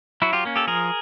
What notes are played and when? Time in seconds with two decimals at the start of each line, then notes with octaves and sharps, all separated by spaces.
0.22 F#3 E4 F#4
0.33 F4 G4
0.45 A#3 C#4
0.56 G4 A4
0.67 F3 G#4 A#4